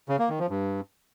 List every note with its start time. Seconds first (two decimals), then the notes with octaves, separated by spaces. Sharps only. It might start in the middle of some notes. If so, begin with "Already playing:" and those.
0.09 C#3
0.19 A#3
0.29 D#3
0.39 F3
0.50 G2